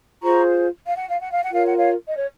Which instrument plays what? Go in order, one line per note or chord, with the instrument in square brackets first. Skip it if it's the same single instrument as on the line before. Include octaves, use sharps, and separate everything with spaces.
[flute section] F4 G#4 C5 A#5 C#6
F5
F#5
F5
F#5
F5
F#5
F4 A#4 C#5 F5
F#5
C#5 F5
D#5
C#5